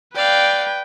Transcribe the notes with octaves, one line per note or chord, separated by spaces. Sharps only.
B4 D5 F5 G5